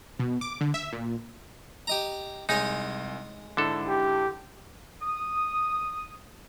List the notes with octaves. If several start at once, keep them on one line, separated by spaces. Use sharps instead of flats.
B2
D6
D3
E5
A#2
G4 D#5 A#5
C2 G#3 D#4 G#4 C#5
G#2 D3 D4 E4 A4
G4
D#6